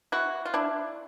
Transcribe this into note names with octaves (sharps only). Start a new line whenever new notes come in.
E4 F#4
F4
D4 E4